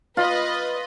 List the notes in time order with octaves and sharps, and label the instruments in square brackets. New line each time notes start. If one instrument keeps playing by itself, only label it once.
[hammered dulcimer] F4 [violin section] B4 D#5